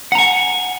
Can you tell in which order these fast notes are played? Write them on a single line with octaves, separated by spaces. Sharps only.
F#5 A#5 G#5